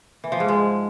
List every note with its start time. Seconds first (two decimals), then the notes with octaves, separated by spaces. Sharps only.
0.24 E3
0.32 F3
0.40 G#2
0.48 G#3